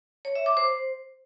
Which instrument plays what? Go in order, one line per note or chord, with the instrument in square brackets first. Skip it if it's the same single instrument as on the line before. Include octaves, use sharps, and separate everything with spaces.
[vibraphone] C#5
E5
D6
C5